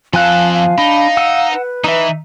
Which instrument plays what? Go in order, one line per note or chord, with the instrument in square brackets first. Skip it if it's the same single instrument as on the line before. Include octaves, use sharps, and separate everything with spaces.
[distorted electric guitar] F2 A4 [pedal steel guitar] F3 G#5 F#6 [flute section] F5
[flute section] F5
[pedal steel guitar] D4 B5 [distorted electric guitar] D#4
[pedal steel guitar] F#5 E6
[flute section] B4
[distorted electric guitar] E3 [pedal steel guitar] D#4 E5